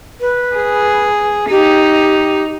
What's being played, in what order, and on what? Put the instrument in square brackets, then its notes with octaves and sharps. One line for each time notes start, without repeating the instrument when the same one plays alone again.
[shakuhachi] B4
[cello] G#4
[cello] D#4 [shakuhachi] G4